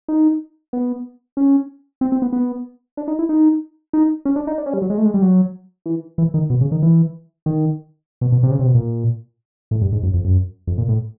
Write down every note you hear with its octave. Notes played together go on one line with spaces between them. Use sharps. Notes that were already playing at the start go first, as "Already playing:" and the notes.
D#4
B3
C#4
C4
C4
B3
B3
D4
D#4
E4
D#4
D#4
C#4
D4
D#4
D4
C#4
G3
F#3
G#3
A3
G#3
G3
F#3
E3
E3
D#3
B2
C#3
D#3
E3
D#3
B2
B2
C3
C#3
C3
B2
A#2
A2
G2
G#2
F#2
F2
F#2
F2
A#2
A2